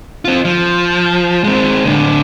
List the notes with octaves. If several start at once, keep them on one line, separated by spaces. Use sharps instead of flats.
C4 F4
F3
G#3 C4
A2 D3